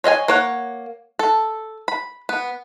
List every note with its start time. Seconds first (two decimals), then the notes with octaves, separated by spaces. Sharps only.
0.04 C#5 D#5 E5 G#5
0.28 A#3 C#5 F#5
1.19 A4
1.88 B5
2.29 B3